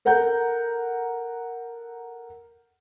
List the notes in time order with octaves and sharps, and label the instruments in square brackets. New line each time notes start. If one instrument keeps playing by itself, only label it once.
[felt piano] A4 A#4 F#5 A#5 G6